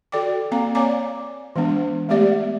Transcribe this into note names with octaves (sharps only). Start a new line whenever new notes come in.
F#4 A4 D5 G5 D6
A#3 C4 F5 A#5
C#5 D5 F5 G#5 A#5 D6
E3 G#3 B3 D4
G#3 A3 B3 G4 D5 E5